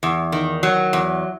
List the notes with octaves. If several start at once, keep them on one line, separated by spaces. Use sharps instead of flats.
E2
D#3
F#3
E2